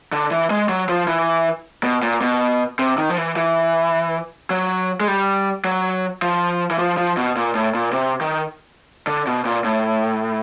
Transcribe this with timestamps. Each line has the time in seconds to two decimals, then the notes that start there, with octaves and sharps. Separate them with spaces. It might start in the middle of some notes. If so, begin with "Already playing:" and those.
0.12 D3
0.31 E3
0.50 G#3
0.69 F#3
0.89 F3
1.08 E3
1.83 B2
2.03 A#2
2.22 B2
2.79 C3
2.98 D#3
3.09 F3
3.18 E3
3.37 E3
4.50 F#3
5.00 G#3
5.08 G3
5.64 F#3
6.22 F3
6.71 E3
6.78 F3
6.98 F3
7.17 B2
7.36 A#2
7.55 A2
7.74 A#2
7.92 C3
8.21 D#3
9.07 D3
9.27 B2
9.45 A#2
9.64 A2